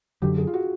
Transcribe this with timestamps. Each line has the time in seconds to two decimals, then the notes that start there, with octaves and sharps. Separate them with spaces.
0.22 F#2 D3 F#3 G4
0.38 G#4
0.47 F4
0.54 F#4